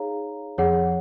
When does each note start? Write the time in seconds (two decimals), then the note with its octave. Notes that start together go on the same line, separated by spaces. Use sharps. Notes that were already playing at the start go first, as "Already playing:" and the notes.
Already playing: D#4 G#4 C#5 F5 A#5
0.58 F2 G#4 C#5 F#5